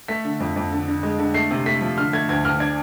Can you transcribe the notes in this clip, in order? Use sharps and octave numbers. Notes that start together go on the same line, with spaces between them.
A3 B6
D3
F2
F2
D3
D3
G#3
D3
A3 C7
C3
A3 B6
F3
D3 F6
A3 G#6
D2 G#6
D2 F6
D4 G#6